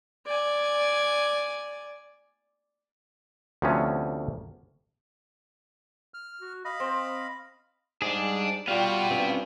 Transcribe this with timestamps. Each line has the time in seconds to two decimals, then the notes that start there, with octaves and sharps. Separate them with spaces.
0.26 D5 G#5
3.62 D2 C3 F3 B3 C#4
6.14 F6
6.41 F#4
6.65 D#5 F5 B5
6.80 C4
8.02 G#2 G3 D4 G#4
8.68 G3 B3 F4 F#4 F5 G5
9.11 G2 C4 C#4